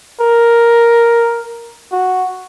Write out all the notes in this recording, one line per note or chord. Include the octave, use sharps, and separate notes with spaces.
A#4
F#4